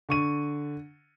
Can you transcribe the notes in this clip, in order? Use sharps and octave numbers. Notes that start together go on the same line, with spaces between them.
D3 C#6 D#7